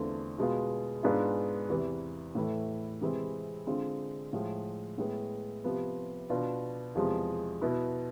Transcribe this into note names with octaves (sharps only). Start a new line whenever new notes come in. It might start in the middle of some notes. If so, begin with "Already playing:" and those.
Already playing: E2 D3 A3 C4 F4
B2 G#3 B3 F4
G#2 G#3 B3 D4 F4
E2 C3 E3
A2 E3 A3 E4
C3 E3 G#3 C4 E4
D3 G#3 C4 F4
A2 F3 G#3
A2 G#3 B3
C3 F3 B3
B2 B3 D4 F4
E2 C3 F3 G#3
B2 B3 E4